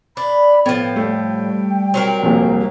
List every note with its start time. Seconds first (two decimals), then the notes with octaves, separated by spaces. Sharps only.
0.17 D4 B5
0.66 A2 F3 B3 G5
0.96 G3 A3 G5
1.94 F#3 C4 A#4
2.23 F1 A#1 D#2